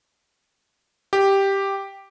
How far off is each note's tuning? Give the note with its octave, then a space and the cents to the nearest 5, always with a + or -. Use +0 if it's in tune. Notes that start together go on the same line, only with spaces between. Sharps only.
G4 +0